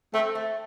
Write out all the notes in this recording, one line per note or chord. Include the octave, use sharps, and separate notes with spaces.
A3 C4
A3